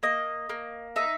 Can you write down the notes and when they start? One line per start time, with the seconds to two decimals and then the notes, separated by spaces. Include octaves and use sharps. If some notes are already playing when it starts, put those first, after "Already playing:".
0.03 A#3 D#5
0.49 A#3
0.96 D#4 E5